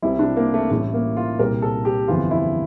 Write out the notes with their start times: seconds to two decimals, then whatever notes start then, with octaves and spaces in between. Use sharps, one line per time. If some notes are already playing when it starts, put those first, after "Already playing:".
0.02 C2 C3 G3 E4
0.19 D4
0.36 A#3
0.54 A3
0.70 A1 A2 G3 A3
0.94 A#3
1.17 F4
1.39 C2 A#2 G3 A#4
1.62 A4
1.85 G4
2.08 G1 F2 E3 F4
2.31 E4